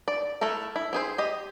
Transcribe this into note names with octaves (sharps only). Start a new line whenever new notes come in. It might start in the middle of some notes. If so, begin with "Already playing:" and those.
D5
A3 E4 A4 A#4
E4
C4 G#4 C5
G4 D#5